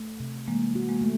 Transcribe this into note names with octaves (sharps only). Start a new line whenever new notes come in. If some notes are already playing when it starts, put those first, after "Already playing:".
Already playing: A3
C3
E3 G#3 A#3
F#4
G#3 A#3
A3